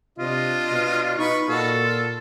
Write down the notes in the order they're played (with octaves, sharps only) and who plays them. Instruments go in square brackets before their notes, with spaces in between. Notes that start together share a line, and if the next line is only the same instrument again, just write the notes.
[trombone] C3 [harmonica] D4 D#5 [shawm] F4
[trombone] B2
[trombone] D#4 [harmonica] B4 C#6
[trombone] A#2 [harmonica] F#4 F5 [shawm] A4
[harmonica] F4